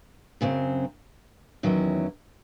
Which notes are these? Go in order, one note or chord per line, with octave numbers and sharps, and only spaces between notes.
F#2 C#3 F#3 C4
E2 D#3 F#3 C#4 E4